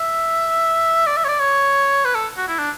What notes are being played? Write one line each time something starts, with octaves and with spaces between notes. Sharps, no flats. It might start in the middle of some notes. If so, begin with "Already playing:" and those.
Already playing: E5
D5
E5
C#5
D5
C#5
B4
A4
F#4
E4
D4